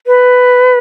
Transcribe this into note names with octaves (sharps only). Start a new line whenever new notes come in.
B4